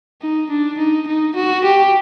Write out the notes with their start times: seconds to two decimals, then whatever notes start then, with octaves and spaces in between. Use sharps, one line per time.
0.21 D#4
0.50 D4
0.78 D#4
1.07 D#4
1.36 F#4
1.64 G4